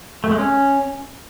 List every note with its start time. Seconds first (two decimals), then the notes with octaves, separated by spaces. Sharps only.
0.24 A3
0.31 G#3
0.38 C#4